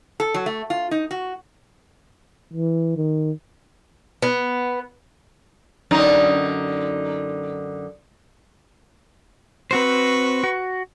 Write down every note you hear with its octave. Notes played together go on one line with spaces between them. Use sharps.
A4
F#3
A3
F4
D#4
F#4
E3
D#3
B3
F#2 D3 D#4
C4 F#4 B4 C5 C#6
F#4